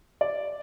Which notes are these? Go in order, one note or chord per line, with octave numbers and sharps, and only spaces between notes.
D5